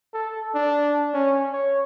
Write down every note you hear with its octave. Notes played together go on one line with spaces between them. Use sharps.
A4
D4
C#4
C#5